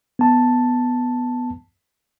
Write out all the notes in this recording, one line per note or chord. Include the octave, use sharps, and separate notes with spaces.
B3 A5